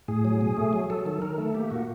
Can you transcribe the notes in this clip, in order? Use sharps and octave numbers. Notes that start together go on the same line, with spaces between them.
A2 G#4
F#3
B2
A3
F#3
F#3 A4
D#3 A4
D#3 A#4
A3 A4
A#3 G4
A#2 F#4